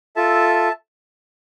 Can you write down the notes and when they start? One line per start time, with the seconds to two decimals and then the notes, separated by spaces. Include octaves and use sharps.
0.16 F4 A4 E5 A5